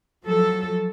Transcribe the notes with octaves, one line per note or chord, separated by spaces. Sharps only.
F3 F#3 A4